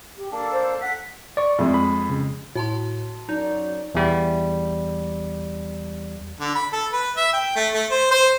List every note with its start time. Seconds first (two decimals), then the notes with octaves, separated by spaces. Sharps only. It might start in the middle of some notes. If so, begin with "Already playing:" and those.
0.16 G4
0.32 A#3 D4 A4
0.52 C5
0.82 F#5 B6
1.37 D5 C#6
1.59 F2 G#3 A3
1.74 B5
2.10 C#3
2.55 A2 F#4 A5 C6
3.29 F#2 F#3 D#4 D5
3.95 E2 G3
6.40 D3
6.55 B5
6.73 A4
6.92 B4
7.17 E5
7.33 G5
7.56 A3
7.74 A3
7.91 C5
8.11 C5